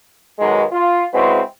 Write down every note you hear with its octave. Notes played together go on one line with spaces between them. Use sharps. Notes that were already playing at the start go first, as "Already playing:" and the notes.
B1 B2 D#3 F#3 G#3
F4
C#3 G#3 C4 E4 F#4 B4